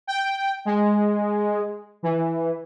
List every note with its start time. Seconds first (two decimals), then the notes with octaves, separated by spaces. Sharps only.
0.07 G5
0.65 G#3
2.03 E3